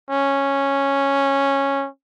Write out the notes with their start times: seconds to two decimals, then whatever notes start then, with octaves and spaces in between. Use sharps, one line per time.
0.10 C#4